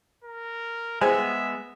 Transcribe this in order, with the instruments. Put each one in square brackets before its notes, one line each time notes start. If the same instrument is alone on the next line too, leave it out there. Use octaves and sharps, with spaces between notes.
[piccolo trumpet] A#4
[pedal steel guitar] G#3 B3 [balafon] G#4 C5 G5 [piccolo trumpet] E5 [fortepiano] G#5